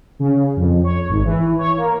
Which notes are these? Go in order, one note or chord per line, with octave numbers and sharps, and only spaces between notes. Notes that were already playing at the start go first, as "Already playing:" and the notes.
C#3
F2
C#5
G#1
E3
C#5
A#3